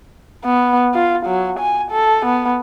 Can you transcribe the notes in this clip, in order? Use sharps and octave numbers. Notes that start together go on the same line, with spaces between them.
B3
F4
F#3
G#5
A4
B3